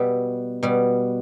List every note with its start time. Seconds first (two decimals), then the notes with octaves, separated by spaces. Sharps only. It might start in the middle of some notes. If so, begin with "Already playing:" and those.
Already playing: B2 G3 E5
0.63 B2 G3